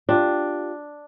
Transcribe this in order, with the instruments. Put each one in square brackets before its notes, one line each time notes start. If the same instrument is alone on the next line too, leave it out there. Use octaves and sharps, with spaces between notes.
[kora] D4 [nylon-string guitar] F4 G4